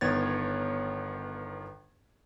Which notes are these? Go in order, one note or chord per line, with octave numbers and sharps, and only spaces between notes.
G1 D#3 B3 C#5 G#6 A6